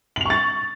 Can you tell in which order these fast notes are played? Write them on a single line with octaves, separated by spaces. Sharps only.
F#7 F7 C#6 A6